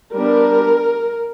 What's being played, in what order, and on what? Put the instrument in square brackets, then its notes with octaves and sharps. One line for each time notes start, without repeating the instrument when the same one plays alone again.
[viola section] G3 B3 D4 A#4